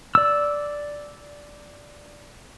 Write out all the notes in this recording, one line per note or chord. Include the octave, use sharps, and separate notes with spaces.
D5 E6